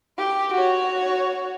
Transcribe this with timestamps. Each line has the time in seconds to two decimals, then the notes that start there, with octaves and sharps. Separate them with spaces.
0.18 G4
0.54 F#4 C#5